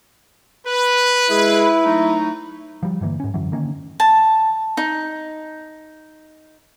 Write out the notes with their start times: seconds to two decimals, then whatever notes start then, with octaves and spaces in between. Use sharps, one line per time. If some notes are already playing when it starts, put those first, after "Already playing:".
0.67 B4
1.30 G#3 E4 G#4
1.83 F#3 A3 D#4
2.83 F3 G3
3.01 G2 D3 E3 A#3
3.20 G#2 C#4
3.34 F#2 D3 E3 F#3
3.52 D3 D#3 A#3 C#4
4.00 A5
4.77 D#4